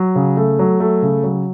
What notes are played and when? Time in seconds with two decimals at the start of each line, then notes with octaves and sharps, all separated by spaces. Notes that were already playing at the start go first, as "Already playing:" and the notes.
Already playing: F#3
0.15 C#3
0.37 A3
0.59 F#3
0.80 A3
1.02 C#3
1.24 F#3